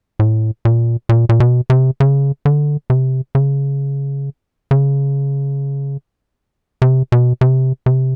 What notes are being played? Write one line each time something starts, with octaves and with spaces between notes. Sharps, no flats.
A2
A#2
A#2
A#2
B2
C3
C#3
D3
C3
C#3
C#3
C3
B2
C3
C3